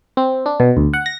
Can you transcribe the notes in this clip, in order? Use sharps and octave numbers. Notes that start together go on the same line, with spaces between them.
C4
D4
B2
D2
F#5
A#6